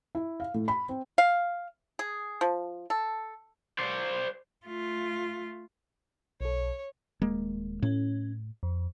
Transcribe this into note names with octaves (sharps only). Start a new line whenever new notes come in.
E4
F5
A2
B5
C4
F5
G#4
F3
A4
C5 D5
A3 F4
B1 A4 C#5
D#1 G#3 A#3
A2 C#4
F2